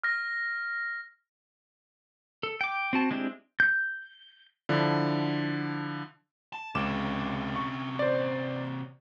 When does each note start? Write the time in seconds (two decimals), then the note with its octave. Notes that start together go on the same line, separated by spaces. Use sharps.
0.04 F6 A#6
2.43 A4
2.61 G5 D6
2.93 C4 F#4 A5
3.11 G#3 C4 D4 E4 G4
3.60 G6
4.69 D3 F3 D4 E4
6.53 A5
6.75 C#2 C3 C#4 D6 E7
7.56 C#6
7.99 C5 D5